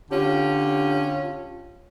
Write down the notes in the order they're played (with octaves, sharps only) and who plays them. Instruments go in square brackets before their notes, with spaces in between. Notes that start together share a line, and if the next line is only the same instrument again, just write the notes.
[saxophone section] D3 C#4 F4 G4